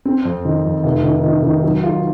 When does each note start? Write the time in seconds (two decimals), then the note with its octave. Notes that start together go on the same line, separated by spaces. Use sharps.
0.05 C4
0.25 F2
0.45 D#3
0.65 F2
0.84 F1
1.04 D#3
1.24 D#3
1.43 D#3
1.63 F#3
1.84 F4